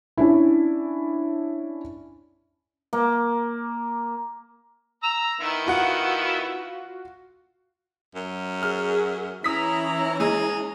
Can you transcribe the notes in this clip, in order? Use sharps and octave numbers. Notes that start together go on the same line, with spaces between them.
C#4 D4 E4
A#3
A#5 E6
D#3 B3 E4
F4 F#4 F#5
F#2
G#4 F6
E3 C#4 E4 A#5 D#6 B6
G#3 G#4